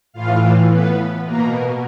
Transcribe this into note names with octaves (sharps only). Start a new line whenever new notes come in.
A2 E3 F4 F5
B3 B4
B2 A#3 A#4